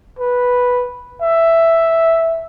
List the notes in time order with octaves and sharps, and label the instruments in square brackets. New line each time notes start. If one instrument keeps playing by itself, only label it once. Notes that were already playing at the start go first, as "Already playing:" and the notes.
[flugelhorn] B4
E5